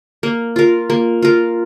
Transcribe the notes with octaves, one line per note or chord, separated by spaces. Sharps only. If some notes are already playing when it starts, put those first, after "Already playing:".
A#3
F4 A#4
A#3
F4 A#4